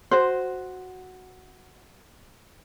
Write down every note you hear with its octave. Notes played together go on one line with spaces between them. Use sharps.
F#4 C5